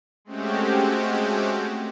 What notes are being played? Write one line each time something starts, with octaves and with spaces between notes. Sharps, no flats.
G#3 A3 C4 C#4 F#4 G4